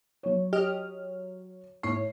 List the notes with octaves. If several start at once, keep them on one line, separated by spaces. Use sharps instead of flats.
F#3 C#5
G4 D#5 F6
A2 C#5 C7